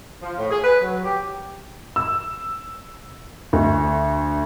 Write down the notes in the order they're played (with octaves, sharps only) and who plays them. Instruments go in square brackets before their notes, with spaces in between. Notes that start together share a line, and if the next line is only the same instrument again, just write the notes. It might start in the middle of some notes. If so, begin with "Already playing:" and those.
[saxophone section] F3
A2
G#4
B4
F#3
G4
[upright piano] E6
D2